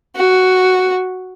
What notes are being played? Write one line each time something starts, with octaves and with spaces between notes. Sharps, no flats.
F#4